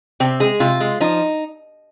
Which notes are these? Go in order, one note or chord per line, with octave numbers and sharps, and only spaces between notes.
C3 C4
G#3 G#4
C3 F4
G#3
F3 D#4